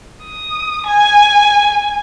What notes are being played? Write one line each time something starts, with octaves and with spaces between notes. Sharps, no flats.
D#6
G#5